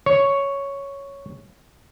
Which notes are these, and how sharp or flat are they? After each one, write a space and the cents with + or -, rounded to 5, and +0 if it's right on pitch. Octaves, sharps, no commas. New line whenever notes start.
C#5 +5